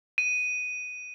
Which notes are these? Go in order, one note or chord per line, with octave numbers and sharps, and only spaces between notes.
D#7